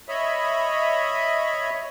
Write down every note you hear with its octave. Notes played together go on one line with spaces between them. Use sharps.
C#5 D#5 E5 B5